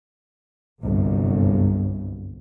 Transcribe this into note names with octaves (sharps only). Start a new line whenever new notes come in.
G1 C2 F#2